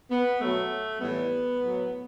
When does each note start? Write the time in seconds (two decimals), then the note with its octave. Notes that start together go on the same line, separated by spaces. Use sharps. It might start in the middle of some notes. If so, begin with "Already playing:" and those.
0.11 B3
0.40 B2 F#3 A3
1.01 A2 E3 G3 B3
1.61 A2 F#3